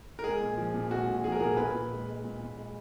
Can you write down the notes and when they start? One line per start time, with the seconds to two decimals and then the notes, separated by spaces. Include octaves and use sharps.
0.19 A#4
0.24 G#3 G#4
0.40 A#2
0.58 F3
0.74 A#2
0.90 G#3 F#4
1.07 A#2
1.24 F3 G#4
1.32 A#4
1.40 A#2 G#4
1.57 A#2 B4
1.74 A#2
1.91 G#3
2.07 G#3
2.24 A#2
2.41 A#2
2.57 G#3